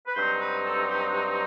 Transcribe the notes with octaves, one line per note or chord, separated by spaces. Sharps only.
B4
G2 F#3 C4 D#4 C5
B4
A4
G4
F#5